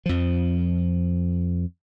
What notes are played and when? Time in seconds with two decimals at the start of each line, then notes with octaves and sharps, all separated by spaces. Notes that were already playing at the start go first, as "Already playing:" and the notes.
0.06 F2 F3